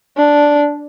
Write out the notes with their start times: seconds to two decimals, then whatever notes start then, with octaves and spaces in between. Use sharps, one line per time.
0.17 D4